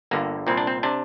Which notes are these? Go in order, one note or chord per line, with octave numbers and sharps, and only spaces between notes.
G1 G2 D3 A#3
C2 A#2 C4
D4
C4
C3 D4